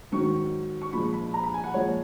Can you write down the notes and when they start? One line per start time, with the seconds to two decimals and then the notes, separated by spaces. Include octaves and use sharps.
0.12 G#2 D#3 F#3 C#6
0.82 C#6
0.93 A#2 F3 G#3 B5
1.13 B5
1.34 A#5
1.44 B5
1.54 G#5
1.64 F#5
1.74 A#2 F3 G#3 C#5